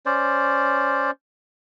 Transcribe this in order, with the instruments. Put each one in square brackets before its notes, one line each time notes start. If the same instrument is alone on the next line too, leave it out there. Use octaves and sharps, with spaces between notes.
[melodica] C#4 C5 D5